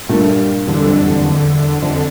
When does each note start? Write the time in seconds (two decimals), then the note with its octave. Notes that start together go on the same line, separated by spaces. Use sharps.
0.09 G2 A#2 A3
0.29 G3
0.67 E2 G2 D3
0.81 G2
0.86 F2
1.06 E2
1.24 E2
1.82 F2 D3